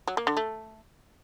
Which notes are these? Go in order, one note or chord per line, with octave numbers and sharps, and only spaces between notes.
F#3
A#3
D3
A3